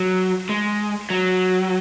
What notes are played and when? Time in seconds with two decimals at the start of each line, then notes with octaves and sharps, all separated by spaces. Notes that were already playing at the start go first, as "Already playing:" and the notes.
Already playing: F#3
0.49 G#3
1.10 F#3